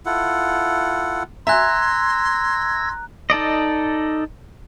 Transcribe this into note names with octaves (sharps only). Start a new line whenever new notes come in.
E4 F4 A4 F#5
E5 G#5 A#5 C6 E6 F#6 G#6 A#6
D#4 A4 D5 D#5